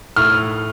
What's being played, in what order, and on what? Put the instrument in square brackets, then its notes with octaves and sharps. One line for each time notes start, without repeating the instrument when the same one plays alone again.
[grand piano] A2 F6